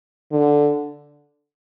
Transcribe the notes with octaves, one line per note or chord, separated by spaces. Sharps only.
D3